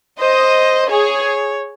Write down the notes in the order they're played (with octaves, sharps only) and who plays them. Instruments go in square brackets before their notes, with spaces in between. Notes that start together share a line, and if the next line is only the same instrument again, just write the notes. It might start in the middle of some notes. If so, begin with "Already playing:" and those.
[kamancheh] C5 [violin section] D#5
[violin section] G#4 [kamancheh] C#5